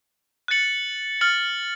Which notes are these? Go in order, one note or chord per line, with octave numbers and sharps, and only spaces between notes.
F#6 A6 C#7 F#7
F6 A6 C#7 F#7